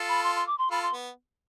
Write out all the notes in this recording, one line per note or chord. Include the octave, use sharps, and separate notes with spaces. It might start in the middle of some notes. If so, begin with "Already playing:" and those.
Already playing: F4 A4
B5
C6
C6
D6
C6
F4 A4 B5
C6
B3